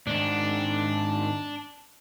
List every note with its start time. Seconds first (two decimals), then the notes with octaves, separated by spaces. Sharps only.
0.07 G#2 D#3 D4